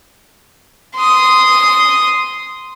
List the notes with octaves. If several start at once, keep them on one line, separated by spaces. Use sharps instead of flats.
C6 D#6